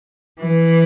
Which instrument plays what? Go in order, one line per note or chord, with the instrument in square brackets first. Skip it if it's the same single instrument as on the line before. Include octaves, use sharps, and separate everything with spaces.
[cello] E3